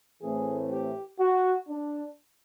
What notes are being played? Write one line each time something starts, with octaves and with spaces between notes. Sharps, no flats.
A2 E3 A3 C4 G#4
G4
F#4
D4